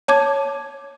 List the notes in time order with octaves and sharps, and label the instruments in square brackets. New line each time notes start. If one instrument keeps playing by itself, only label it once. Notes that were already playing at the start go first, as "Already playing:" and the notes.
[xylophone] C#5 A5 D6 G#6